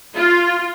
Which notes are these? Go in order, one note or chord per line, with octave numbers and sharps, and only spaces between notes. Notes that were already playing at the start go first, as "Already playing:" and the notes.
F4